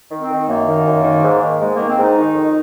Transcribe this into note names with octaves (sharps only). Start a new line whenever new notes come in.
D#3
C4
D#3
F#2 A#3
D#3
F#2
D#3
G#2
D#3
G#2 G#3
D#3 A#3
C4
G#2 D#4
D#3
F2